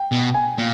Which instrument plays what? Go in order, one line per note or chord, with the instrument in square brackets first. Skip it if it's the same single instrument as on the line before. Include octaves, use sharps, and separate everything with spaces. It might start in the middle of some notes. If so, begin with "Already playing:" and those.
Already playing: [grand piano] G5
[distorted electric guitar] B2
[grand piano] G#5
[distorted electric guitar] A#2